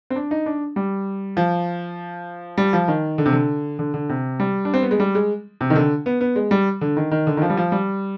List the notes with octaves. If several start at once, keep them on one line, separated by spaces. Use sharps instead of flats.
C4
D4
D#4
D4
G3
F3
G3
F3
D#3
D3
C3
D3
D3
D3
C3
G3
D4
C4
B3
G#3
G3
G#3
C3
D#3
D3
B3
B3
G#3
G3
D3
D#3
D#3
D3
D#3
F3
G3
F3
G3